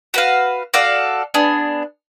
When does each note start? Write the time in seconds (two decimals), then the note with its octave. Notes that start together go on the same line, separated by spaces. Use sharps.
0.14 F#4 B4 F5
0.74 F#4 A4 D5 F5
1.34 B3 D4 G#4